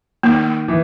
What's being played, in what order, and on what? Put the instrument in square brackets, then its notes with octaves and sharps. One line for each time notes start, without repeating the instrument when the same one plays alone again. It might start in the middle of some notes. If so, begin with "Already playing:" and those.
[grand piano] D#3 [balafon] A#3
[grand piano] E3